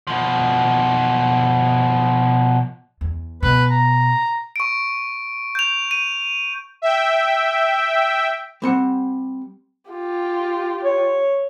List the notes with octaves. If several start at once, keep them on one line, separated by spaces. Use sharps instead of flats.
B2 F3
E2
B2 B4
A#5
C#6 D7
G6 F7
D#7
E5 G5
G3 C4 F#5
F4 G4
C#5